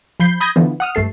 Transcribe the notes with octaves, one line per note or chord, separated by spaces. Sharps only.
F3 B5 G6 C7
B5 D#6 G6 G#6 A#6
D3 E3 F3 B3
F#5 D#6 F6
G2 A3 A4 C7